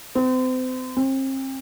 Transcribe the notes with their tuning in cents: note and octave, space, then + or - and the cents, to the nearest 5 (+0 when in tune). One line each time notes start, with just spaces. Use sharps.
C4 -35
C4 +35